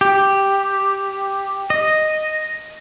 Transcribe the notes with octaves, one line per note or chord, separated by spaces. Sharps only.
G4
D#5